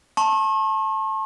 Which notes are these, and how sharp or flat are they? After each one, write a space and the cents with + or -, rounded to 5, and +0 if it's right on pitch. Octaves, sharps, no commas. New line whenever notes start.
A5 +0 C#6 -45